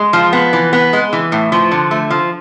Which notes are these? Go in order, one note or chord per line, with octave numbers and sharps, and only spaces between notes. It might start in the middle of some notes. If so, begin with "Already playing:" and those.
Already playing: G#3
F3
B3
E3
B3
G#3
E3
A2
F3
D3
A3
F3